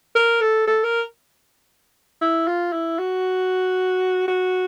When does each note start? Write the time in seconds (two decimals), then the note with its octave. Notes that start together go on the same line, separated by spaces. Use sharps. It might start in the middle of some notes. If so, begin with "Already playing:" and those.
0.15 A#4
0.41 A4
0.67 A4
0.84 A#4
2.21 E4
2.47 F4
2.72 E4
2.99 F#4
4.28 F#4